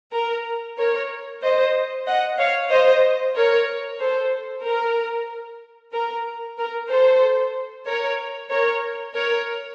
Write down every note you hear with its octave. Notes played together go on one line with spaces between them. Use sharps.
A#4
A#4 C#5
C5 D#5
D#5 F#5
C#5 F5
C5 D#5
A#4 C#5
A4 C5
A#4
A#4
A#4
A4 C5
A#4 C#5
A#4 C#5
A#4 C#5